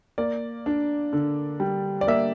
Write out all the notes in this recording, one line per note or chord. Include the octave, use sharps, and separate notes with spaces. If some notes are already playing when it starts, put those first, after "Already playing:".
A#3 D5
D4
D3
G3
D5
A#3 E5